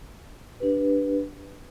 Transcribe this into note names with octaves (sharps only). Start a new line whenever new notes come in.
D4 G4 B4